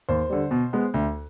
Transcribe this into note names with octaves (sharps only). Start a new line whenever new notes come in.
D#2 C5
D3 G3
B2
G#3 B3
D2